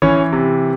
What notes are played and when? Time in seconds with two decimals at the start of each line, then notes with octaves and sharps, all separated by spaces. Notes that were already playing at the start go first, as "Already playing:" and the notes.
0.02 E3 C#4 C#5
0.33 C3